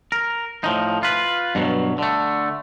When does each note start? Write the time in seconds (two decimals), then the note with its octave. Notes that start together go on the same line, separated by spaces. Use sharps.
0.12 A#4
0.64 A2 F3 D#4
1.03 F4 B4
1.55 G2 B2 E3 F#3
1.98 D3 A3